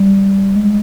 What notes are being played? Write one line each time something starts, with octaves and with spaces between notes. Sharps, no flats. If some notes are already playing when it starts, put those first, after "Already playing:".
Already playing: G3
G#3